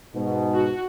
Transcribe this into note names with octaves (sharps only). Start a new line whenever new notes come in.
G#2 B2
F#4